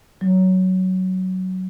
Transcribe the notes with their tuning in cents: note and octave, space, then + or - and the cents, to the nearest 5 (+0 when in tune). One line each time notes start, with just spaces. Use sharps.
F#3 +10